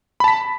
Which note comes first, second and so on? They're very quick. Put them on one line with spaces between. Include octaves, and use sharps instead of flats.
B5 A5 B6